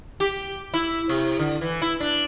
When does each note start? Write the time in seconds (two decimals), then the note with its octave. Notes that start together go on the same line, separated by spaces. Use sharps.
0.20 G4
0.74 E4
1.09 C3
1.39 D3
1.61 E3
1.82 E4
2.00 D4